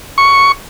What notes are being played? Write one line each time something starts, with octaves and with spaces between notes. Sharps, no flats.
C#6